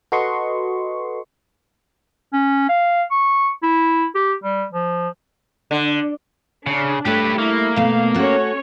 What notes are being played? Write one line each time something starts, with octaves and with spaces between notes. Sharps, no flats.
F#4 A4 B4 D#5 C6 C#6
C#4
F5
C#6
E4
G4
G3
F3
D3
C#3 D4
G3 A3 G4 B4 C#5
A#3 E4
B2 A3 F5
C#4 F#4 A4 C#5